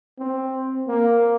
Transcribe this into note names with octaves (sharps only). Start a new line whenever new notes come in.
C4
A#3